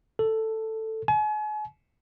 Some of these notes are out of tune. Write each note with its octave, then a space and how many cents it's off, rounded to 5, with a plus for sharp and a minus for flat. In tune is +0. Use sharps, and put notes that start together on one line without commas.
A4 +5
G#5 +40